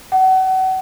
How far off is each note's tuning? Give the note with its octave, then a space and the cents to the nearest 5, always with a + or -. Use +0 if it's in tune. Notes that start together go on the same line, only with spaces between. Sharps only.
F#5 +35